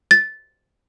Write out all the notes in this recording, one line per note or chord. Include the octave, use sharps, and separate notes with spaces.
A6